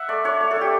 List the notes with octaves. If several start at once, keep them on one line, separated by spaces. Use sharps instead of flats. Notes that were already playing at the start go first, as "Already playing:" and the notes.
Already playing: E5 F#5
A3 D5
D4 C#5
A3
A4
D4
G4